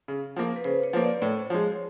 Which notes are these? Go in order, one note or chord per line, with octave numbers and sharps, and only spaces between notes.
C#3
F3 A#3
B4
C#3 C5
C#5
F3 A#3
D5
A2 C#5
F3 G#3